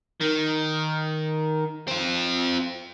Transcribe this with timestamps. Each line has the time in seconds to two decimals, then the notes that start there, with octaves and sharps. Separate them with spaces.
0.20 D#3
1.88 C4 F4